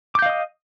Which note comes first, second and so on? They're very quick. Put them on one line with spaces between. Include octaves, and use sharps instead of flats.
D6 G6 F5 D#5 D#6